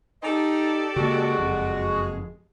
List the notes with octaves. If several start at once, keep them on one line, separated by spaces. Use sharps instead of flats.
D#4 G4 A4 D5 D#5
C#3 G#3 A#3 F#4 G#4
F#1 F2